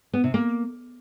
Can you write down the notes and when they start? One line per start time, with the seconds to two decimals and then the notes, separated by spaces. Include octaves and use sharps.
0.13 B3
0.24 C3
0.34 A#3